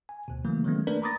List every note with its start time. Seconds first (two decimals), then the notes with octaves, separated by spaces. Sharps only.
0.09 G#5
0.28 D2 B2
0.45 C#3 E3 F#3 A3 A#3
0.64 D#3 F#3 G#3 A3 B3 C#4
0.87 A3 A#3 D4 A#4 B4 D5
1.02 A#5 B5 D6 D#6 A6 A#6